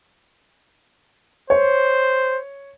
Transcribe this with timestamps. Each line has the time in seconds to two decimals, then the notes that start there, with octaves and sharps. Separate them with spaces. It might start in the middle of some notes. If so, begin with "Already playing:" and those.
1.50 C5 C#5